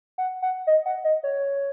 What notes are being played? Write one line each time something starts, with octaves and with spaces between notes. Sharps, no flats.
F#5
F#5
D#5
F#5
D#5
C#5